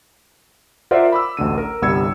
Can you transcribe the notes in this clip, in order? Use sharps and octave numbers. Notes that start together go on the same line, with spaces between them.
F4 A#4 C5 D5 E5 F#5
B5 D6 E6
A1 D2 D3 D#7
A#4
G1 C2 G3 E6 G#6 C#7